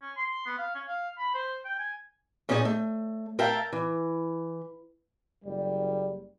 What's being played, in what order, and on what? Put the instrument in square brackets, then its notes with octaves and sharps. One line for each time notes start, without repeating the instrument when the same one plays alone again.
[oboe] C#4
C6
B3
F5
C#4
F5
B5
C5
G5
G#5
[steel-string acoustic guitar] A#2 C#4 D#4 G#4 C#5 A5
A3
A#4 E5 F5 G5 A5
E3
[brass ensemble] F#1 G3